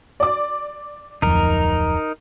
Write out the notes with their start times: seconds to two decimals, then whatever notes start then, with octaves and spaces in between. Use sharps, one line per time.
0.20 D5 D6
1.22 D1 F2 D#4 A#4